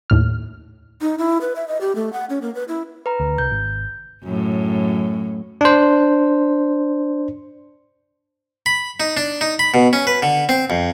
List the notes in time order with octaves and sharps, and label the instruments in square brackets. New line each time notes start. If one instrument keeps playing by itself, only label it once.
[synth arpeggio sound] D#2 A2 F6
[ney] D#4
E4
B4
E5
D#5
G4
A3
F#5
C#4
A#3
B4
E4
[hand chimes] B4 A#5
[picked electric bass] D2
[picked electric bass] C2 [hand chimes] G6
[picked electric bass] G#1
[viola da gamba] F#2 A2
[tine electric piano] D4 C5
[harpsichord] B5
D#4
D4
D#4
B5
B2
C#4
B4
D3
C4
F2